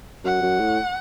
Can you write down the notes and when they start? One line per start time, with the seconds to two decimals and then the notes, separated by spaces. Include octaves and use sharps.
0.24 F#2 F#5
0.42 F#2
0.60 A2